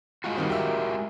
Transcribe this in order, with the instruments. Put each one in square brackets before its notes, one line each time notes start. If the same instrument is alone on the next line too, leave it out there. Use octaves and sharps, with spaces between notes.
[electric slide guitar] G#3 F4 F#4
[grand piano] D#3 G3 C4
G4 A#4 E5